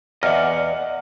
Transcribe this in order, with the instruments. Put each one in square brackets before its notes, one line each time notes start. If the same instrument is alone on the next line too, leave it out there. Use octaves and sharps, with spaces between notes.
[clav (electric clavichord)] E2 [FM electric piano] D5 F6 [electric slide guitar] D#5 F#5